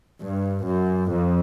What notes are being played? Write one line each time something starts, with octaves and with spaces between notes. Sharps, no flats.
G2
F#2
F2